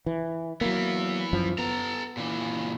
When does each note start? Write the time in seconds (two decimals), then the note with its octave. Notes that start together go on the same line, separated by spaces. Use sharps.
0.06 E3
0.61 E3 F#3 A#3 B3
1.33 F#2 F3
1.58 B3 A4 A#5
2.17 A#2 E3